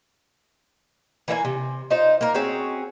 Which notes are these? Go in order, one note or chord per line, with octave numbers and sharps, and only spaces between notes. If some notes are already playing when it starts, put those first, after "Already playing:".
E3 A#3 E5 G#5
C3
D#4 F4 C5
A#3 A#4
C4 C#4 F#4 G#4